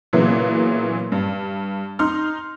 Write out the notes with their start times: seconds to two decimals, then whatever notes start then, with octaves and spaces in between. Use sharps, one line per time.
0.13 A#2 C#3 E3 F#3 B3
1.12 G2
1.99 D#4 C6 F6